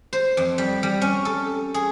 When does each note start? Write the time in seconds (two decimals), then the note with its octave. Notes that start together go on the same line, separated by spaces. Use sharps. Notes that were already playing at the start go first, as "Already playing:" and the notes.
0.13 C5
0.37 F2
0.58 G3
0.83 G3
1.02 C#4
1.25 A4
1.74 G#4